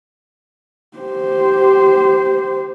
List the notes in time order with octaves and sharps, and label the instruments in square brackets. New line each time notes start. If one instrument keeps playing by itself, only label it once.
[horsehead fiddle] G4 C5